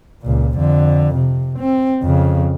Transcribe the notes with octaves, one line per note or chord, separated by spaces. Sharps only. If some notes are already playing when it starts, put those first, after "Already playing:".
C#2 A#2
F2 D3
C3
C4
F2 C#3